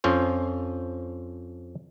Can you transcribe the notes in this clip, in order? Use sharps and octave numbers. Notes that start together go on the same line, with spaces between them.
F2 F3 C#4 C5